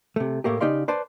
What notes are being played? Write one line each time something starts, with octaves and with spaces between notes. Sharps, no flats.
C3 A3
A2 A3 A#3 G4
C#3 D#4 G4 D5 F5 C6
B4 C5 D5 A5